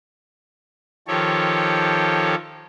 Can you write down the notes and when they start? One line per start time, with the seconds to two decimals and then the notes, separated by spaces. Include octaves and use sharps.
1.08 D#3 F3 G4 A4 C#5